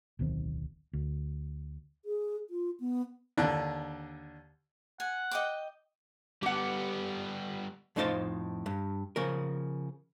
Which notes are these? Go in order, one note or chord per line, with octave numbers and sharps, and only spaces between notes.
D1 B1 D#3 C4
D2
G#4
F4
B3
D#2 D3 D4
F#5 G#5
D#5 G5 D6
G3 B3 G4 F#5
F2 A2 D#4 C5 F5 A5
G2
C#3 F3 A#4